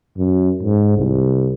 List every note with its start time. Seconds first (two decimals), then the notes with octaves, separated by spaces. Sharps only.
0.17 F#2
0.63 G#2
0.98 C2